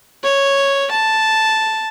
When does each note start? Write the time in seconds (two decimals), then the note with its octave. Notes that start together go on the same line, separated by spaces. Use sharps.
0.24 C#5
0.91 A5